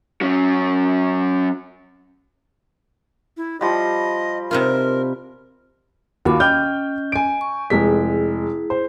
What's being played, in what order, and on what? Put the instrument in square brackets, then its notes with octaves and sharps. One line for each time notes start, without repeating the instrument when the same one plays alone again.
[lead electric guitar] F#3 C#4
[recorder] E4
[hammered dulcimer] F3 G3 [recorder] D#5
[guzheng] C3 D#4 F4 [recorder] A#4
[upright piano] D#2 F4 F#4 [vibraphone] F5 B5 D6
[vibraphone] C#4 D#5 [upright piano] G5 F6 G6
[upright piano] G#5 D7
[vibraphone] C#6
[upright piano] F1 G#3 B6 [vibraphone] E4 G#4
[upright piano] C5